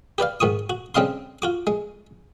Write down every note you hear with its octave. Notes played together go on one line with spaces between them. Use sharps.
G4 B4 D5 F5
G#2 D#3 C#6 D#6
F#4
C#3 G3 C4 D#5 F5 C6
F4 F#4 D6
G#3